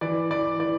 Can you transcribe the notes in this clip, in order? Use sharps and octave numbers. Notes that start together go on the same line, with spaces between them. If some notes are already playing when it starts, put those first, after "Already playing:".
E3 D5
E3 D5
E3 D5